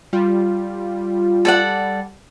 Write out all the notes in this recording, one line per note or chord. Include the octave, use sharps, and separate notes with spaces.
G3 F4
A4 D5 F#5